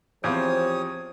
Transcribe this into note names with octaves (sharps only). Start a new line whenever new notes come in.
E2 F3 C4 G4 C5 C#5 F5 D#6